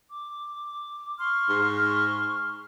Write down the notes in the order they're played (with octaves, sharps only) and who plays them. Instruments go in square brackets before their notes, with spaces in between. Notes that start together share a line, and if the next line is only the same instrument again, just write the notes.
[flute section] D6
C6 C#6 F6
[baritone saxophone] G#2